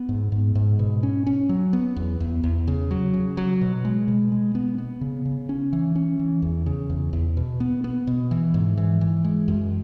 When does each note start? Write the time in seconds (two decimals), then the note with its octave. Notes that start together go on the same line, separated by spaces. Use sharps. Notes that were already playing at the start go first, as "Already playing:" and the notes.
Already playing: B3
0.09 G#2
0.32 G#2
0.55 G#2
0.79 B2
1.03 C#4
1.27 C#4
1.49 F#3
1.73 B3
1.97 E2
2.20 E2
2.43 E2
2.68 C#3
2.91 F#3
3.14 C#3
3.37 F#3
3.61 B2
3.85 G#3
4.08 B2
4.32 G#3
4.55 B3
4.78 B3
5.01 C#3
5.25 C#3
5.49 C#4
5.73 E3
5.96 C#4
6.20 E3
6.42 E2
6.66 C#3
6.90 E2
7.13 E2
7.37 B2
7.60 B3
7.84 B3
8.07 B2
8.31 E3
8.54 G#2
8.77 E3
9.01 E3
9.24 G#3
9.48 F#2